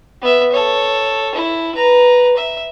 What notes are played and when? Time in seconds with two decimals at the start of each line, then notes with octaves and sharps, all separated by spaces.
0.22 B3 E5
0.52 A4 C#5
1.35 E4
1.75 B4 A#5
2.37 E5